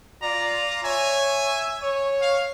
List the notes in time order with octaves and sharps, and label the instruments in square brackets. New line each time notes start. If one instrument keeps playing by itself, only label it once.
[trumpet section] F4 A#5 [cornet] D5
[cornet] C#5 [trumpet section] E5 G#5
[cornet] C#5
[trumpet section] F5